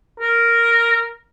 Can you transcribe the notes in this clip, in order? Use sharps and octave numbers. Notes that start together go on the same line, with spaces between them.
A#4